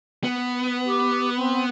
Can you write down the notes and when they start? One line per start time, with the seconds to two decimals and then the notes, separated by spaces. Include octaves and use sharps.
0.24 B3
0.85 G4
1.37 C4